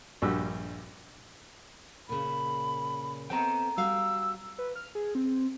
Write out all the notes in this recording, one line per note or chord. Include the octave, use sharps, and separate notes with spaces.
A#1 G2 F#4 G4 E6
A#2 C#3 B5
B3 C4 A4 G5 A#5
G3 F#4 F5 E6
B4
F6
G#4
C4